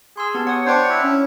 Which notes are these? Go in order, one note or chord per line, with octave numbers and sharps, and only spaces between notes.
G#4 C6 E6
B3 G4 A5
C#5 F#5 D#6
D4 C5 C#5 F#5 G5 C#6
E4
C#4